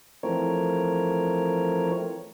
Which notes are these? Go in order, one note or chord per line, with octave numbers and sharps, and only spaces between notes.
E3 F3 A3 C4 A#4 C#5